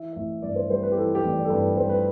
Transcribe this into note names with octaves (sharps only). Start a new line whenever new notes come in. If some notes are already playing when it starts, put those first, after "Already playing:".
Already playing: E3 E5
A1 E5
G2 D5
C5
G3 C5
B4
G4
E3 A4
G4
A1
D5
A4
G2 B4
G3 C5
B4